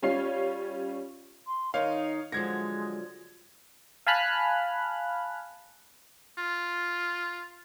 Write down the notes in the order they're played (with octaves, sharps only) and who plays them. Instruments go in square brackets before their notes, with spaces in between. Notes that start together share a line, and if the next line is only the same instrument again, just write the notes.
[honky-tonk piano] G3 C#4 F4 C#5 C7
[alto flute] C6
[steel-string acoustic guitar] D#3 D#4 [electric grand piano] C#5 F5 [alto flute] D#5
[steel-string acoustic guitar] D3 F3 F#3 [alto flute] G#3 [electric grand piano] G#6 A#6
[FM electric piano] F5 G#5 A5 B5 F6 F#6
[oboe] F4